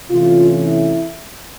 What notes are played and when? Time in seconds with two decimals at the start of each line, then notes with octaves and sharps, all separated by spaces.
0.10 C3 E3 A3 C#4 F4
0.64 E4